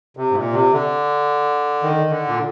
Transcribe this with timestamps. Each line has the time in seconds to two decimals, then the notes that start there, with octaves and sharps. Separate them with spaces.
0.17 C3
0.32 G#2
0.36 A#2
0.53 C3
0.73 D3
1.82 D#3
2.10 D3
2.28 A#2